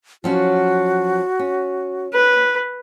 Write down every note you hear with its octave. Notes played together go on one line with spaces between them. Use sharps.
F3 F#3 C#4 F#4
C#4
B4